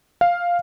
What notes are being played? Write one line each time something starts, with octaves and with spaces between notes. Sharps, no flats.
F5